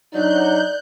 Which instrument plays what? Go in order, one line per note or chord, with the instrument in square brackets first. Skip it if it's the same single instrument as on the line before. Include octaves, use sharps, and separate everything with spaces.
[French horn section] F#3 D4 [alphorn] D#4 [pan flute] D5 [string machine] F#6 G6